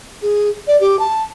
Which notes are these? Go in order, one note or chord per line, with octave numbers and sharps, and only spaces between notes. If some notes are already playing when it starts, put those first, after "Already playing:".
G#4
D5
G4
A5